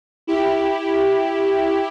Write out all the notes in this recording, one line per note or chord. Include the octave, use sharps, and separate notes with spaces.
E4 G4